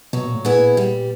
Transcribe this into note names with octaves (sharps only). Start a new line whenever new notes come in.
B2 F#3
A#2
A2
A#2 B3 E4 G#4
G3